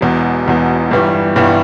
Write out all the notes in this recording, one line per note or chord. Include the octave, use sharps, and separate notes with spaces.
E1 E2 B2
E1 E2 B2
G1 G2 E3 G3 B3
G1 G2 E3 G3 B3